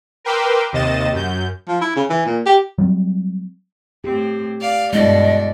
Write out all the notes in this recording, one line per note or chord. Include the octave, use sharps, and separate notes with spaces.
A#4 B4 G5 C6 D6 E6
D#2 C3 D#5 A6 E7
F#2 G6
F3
E4
C#3
E3
A#2
G4
F#3 G3 C4
A2 C4 G4
D5 F5
G2 B2 G#3 D4 E4 D5 D#5